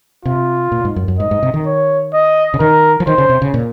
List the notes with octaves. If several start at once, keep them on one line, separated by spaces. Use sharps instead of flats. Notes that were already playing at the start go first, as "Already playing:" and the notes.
C3 F4
A#2
G#2
F#2
F#2
G#2 D#5
G#2
C3
D#3
C#5
D#5
C#3
D#3 A#4
F3
D#3 C5
C#3
C3
C#3
A#2